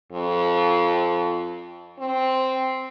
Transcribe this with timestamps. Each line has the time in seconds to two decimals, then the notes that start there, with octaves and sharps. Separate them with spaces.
0.12 F2
1.99 C4